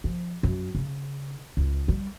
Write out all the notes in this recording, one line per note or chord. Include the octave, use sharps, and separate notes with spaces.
F3
F#2
C#3
C#2
G3